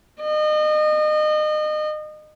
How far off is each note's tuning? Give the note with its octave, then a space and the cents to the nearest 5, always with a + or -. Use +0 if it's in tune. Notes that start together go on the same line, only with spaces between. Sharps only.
D#5 -30